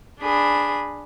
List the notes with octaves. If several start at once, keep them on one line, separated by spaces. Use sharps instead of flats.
D4 G#4 B5